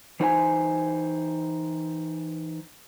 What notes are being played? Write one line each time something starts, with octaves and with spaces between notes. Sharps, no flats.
E3 D#4 C5 D5 G#5